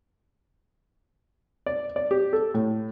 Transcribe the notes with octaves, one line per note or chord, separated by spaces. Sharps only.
D5
D5
G4
A4
A2